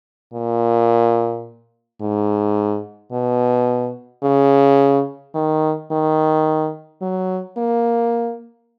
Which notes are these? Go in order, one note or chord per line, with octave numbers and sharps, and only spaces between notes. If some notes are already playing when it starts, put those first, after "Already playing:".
A#2
G#2
B2
C#3
D#3
D#3
F#3
A#3